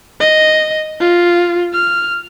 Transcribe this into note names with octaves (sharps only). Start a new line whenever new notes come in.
D#5
F4
F6